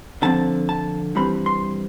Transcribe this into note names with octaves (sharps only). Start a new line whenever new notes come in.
D3 F3 C4 A5
A5
G2 E3 G3 C4 B5
C6